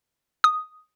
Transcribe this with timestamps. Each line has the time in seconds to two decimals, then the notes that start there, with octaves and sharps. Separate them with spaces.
0.44 D#6